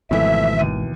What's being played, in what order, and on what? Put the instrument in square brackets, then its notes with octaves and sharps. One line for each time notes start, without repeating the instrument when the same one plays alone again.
[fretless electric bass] G#1 [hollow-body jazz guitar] B2 E3 [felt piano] F3 A3 [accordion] E5
[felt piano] D#2 D#7